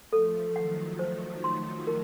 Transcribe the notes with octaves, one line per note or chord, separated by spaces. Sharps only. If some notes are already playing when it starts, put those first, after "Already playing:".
F3 A3 A4
D#3 F#3 F#5
F3 A3 C5
C6
A#4